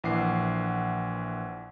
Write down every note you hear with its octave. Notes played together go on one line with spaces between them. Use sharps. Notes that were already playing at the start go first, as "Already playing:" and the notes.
A#1 E3 F#5 D6 C7